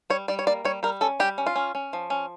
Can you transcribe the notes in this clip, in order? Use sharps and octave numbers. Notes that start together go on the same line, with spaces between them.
G3 C#5
G3 D5
C#5
A#3 D5
G3 C#5
G3 A#4
C#4 A4
G3 G4
C#4
F4
C#4
C#4
F3
C#4